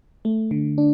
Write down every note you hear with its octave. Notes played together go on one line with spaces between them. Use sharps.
A3
D3
D4